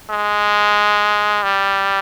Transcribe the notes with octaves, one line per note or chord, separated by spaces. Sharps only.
G#3
G3